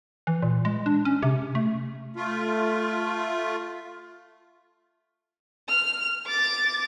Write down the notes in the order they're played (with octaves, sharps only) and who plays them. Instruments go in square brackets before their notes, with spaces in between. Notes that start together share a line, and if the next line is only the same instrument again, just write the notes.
[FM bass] E3
A#2
G#3
D4
C#4
C3
A3
[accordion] A3 F4
[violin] F6
D6 A6